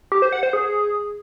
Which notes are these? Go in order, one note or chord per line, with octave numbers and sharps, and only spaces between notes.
G4
C5
F#5
C5
G#4